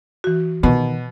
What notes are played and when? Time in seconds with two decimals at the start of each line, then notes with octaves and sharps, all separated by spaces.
0.24 E3 F#4
0.63 B2 D#3